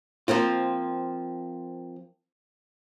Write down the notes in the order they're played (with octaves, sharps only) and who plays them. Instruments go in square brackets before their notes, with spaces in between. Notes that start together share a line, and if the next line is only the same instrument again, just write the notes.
[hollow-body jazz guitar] F3 A#3 C4 F4